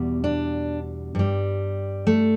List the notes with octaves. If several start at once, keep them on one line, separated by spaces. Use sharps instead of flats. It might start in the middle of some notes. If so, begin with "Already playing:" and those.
Already playing: E2 B2 G3
D4
G2 G3
A3